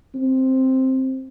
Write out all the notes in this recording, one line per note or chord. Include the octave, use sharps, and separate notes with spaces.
C4